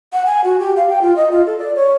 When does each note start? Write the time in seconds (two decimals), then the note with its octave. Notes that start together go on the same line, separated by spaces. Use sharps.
0.13 F#5
0.26 G#5
0.44 F#4
0.60 G4
0.77 F5
0.89 G5
1.02 F4
1.16 D#5
1.31 F4
1.46 A4
1.58 D5
1.75 C#5